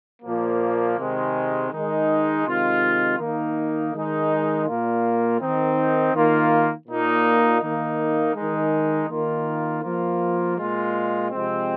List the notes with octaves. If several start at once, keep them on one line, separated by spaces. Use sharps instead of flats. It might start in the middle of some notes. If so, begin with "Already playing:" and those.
A#2 F3 A#3
C3 D#3 G#3
D#3 G#3 D#4
C3 D#3 G#3 F4
D#3 A#3 D#4
D#3 G#3 D#4
A#2 A#3 F4
D#3 C4 D#4
D#3 A#3 F4
A#2 A#3 D#4
D#3 A#3 D#4
D#3 G#3 D#4
D#3 A#3 F4
F3 A#3 F4
A#2 G#3 F4
C3 F3 G#3 C4